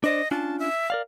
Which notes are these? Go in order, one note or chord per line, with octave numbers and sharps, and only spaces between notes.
D4 C5 D5 D#5
C#4 D4 F4 A5
E5
A#4 D5 F5